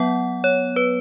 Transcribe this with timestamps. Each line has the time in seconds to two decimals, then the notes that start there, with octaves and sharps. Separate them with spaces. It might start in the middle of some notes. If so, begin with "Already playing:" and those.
Already playing: F#3 B3 F#5
0.44 C#5
0.76 B4